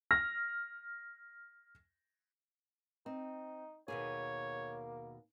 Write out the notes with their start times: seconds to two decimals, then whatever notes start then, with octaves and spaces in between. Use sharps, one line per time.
0.11 F6 A#6
3.06 C4 D#4
3.88 D#2 B2 A#3 G#4 C#5